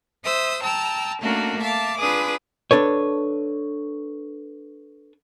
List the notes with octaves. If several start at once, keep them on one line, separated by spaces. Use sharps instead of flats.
C5 E5 D#6 E6
G5 A5 A#5 E6
A3 A#3 C#4 D4 F#4 A#4
E5 F5 A5 D6
D4 F4 G#4 B4 D6 D#6
D4 A4 B4 C#5